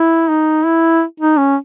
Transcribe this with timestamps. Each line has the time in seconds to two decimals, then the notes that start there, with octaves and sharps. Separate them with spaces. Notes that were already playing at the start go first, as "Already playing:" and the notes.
Already playing: E4
0.29 D#4
0.65 E4
1.20 D#4
1.38 C#4